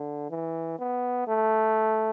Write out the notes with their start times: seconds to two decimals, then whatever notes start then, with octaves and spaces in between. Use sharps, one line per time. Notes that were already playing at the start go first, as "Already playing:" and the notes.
Already playing: D3
0.30 E3
0.78 B3
1.27 A3